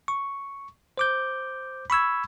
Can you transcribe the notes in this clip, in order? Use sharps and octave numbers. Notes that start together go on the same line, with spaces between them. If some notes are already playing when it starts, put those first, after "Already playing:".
C#6
C5 D6 G6
B5 C#6 E6 G#6